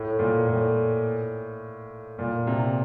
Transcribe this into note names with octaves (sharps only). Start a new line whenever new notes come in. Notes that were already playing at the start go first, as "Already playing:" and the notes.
Already playing: A2
A#2
A2
A#2
C3